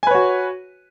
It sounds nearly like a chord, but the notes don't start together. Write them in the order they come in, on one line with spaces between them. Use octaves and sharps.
G#5 B4 C#5 F#4